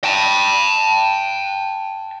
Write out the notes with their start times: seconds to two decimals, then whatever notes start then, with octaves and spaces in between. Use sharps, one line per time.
0.04 G5 A5